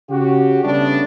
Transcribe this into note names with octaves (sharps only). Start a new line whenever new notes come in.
C#3 F#4 G4
C#3 G3 A3 B3 D4